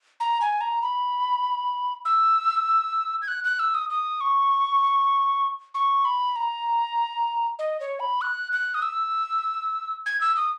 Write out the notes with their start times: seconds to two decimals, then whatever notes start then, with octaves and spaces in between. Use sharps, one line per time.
0.20 A#5
0.41 G#5
0.61 A#5
0.82 B5
2.05 E6
3.22 G#6
3.28 F#6
3.44 F#6
3.59 E6
3.74 D#6
3.90 D#6
4.21 C#6
5.74 C#6
6.05 B5
6.36 A#5
7.59 D#5
7.80 C#5
8.00 B5
8.21 F#6
8.52 F#6
8.74 D#6
8.82 E6
10.06 G#6
10.21 E6
10.37 D#6